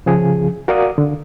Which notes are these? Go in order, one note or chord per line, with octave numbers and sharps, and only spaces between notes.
C#3 F3 G#4
F#4 A#4 D5 F5 D#6
D3